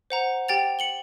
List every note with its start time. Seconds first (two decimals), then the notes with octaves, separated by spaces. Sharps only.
0.10 C5 F#5 A#5
0.48 G4 G5 A6 F7
0.79 C#7 F#7 G7